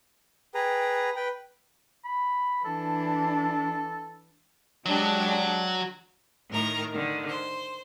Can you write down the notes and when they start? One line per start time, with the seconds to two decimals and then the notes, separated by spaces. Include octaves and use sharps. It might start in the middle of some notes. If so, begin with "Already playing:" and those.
0.55 G#4 B4 G5 A#5
1.16 B4 G5
2.05 B5
2.64 E3 D4 A4
4.86 F#3 G#3 D4 G4
6.50 A2 D#3 A#4 A#5
6.91 D3 D#3
7.28 C5